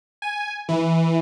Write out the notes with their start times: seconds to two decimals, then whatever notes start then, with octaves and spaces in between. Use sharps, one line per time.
0.22 G#5
0.69 E3